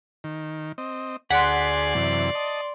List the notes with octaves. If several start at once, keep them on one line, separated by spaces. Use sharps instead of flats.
D#3
C4 D#5
D2 G#4 D5 F#5 G#5 C6 B6
F#2 C3 E3
D#5 A5